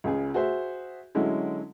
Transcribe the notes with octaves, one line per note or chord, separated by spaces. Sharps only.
C#2 C#3 G#4
F#4 G#4 C5 E5
D3 F#3 G#3 C#4 E4